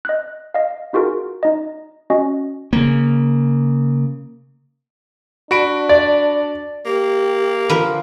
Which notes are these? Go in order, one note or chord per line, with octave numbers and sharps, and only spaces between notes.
D#5 F#6
D#5 F5
D#4 F4 F#4 G#4 A#4
D#4 D#5
C#4 F#4 D#5
C#3 A#3
D4 F#4 B5 D7
D5
A#3 G4
D3 F3 A#4 B4 D6